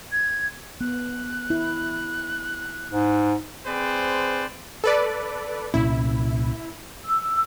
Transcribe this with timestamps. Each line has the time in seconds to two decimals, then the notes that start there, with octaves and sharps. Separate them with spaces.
0.12 G#6
0.81 B3 F#6
1.50 E4
2.92 G#2
3.67 C4 G#4 B4 C5 D5
4.84 A4 B4 D5
5.74 C2 A#2 C#4 E4
7.04 E6